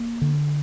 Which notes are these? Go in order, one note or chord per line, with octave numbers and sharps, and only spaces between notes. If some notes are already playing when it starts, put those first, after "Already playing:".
Already playing: A#3
D3